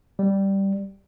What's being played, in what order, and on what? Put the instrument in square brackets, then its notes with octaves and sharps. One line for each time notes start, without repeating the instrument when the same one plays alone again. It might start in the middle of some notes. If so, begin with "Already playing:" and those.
[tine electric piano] G3